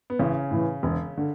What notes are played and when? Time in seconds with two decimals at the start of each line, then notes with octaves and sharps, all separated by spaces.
0.10 B3
0.19 A1 C#3 C#4
0.51 A2 E3
0.83 E1
1.17 D3